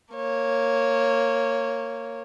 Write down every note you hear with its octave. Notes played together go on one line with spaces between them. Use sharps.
A#3 C#5